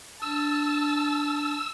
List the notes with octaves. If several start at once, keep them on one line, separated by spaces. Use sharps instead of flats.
D4 A5 E6